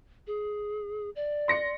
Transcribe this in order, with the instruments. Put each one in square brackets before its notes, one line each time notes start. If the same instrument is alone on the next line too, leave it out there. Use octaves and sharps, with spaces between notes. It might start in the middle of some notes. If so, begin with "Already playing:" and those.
[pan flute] G#4
D5
[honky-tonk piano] C6 A#6 C#7